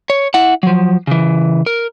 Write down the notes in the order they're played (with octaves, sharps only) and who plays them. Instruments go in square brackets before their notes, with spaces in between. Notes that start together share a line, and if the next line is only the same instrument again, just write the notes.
[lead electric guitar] C#5
E4 F#5
F3 F#3
C#3 E3
A#4